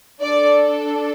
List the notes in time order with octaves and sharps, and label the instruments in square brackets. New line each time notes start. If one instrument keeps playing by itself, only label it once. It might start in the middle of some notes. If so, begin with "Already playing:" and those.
[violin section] D4 A4 D5